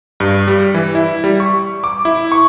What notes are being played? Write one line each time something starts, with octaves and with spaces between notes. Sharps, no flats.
G2
G3
E3
E4
G3
C#6
D6
E4
C#6